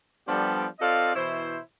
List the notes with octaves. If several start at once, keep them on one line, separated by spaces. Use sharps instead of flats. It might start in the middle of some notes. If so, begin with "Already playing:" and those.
F3 G3 B3 D4 G4 A4
C4 F4 A4 D5 D#5 F5
B2 E3 E4 C5